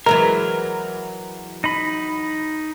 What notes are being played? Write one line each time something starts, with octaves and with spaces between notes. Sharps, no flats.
E3 F#3 G#3 A#4
D#4 B5